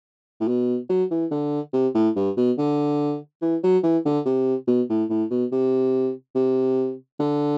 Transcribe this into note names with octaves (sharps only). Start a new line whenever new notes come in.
A2
B2
F#3
E3
D3
C3
A2
G2
B2
D3
E3
F#3
E3
D3
C3
B2
A2
A2
B2
C3
C3
D3